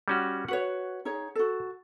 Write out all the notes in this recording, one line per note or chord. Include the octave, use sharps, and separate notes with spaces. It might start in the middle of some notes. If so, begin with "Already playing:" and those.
G3 C#4 F#4
F#4 B4 C#5 F#5
D#4 G#4 C#5
F#4 A4